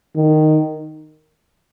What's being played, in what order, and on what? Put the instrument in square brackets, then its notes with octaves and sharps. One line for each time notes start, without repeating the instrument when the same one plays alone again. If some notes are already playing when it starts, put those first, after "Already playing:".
[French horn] D#3